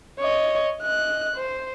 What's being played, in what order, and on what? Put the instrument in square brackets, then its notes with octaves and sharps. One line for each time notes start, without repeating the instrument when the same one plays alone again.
[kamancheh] C#5 D#5
D#5 F#6
C5